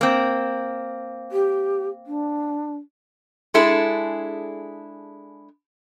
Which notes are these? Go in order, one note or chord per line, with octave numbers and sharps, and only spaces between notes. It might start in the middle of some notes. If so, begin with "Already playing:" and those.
A#3 C4
G4
D4
G#3 D4 E4 G#4 A4